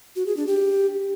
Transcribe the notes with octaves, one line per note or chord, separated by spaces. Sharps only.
F#4
G#4
D4
G4